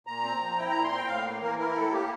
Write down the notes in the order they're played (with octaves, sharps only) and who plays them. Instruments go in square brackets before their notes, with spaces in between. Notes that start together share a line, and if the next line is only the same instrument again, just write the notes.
[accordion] A#2 A#5
C4
F3
E4 G5
A#2 A#5
C6
C4 G5
A2 F5
A#3
E3 A#4
E4 A#4
A2 A4
A#3 G4